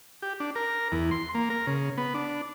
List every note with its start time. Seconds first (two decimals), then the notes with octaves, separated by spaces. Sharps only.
0.22 G4
0.40 D4
0.55 A#4
0.92 E2
1.11 C6
1.35 A#3
1.50 A#4
1.67 C#3
1.98 B3
2.14 D4